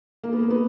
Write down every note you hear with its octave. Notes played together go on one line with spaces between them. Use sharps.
A#3
B3
A#3
B3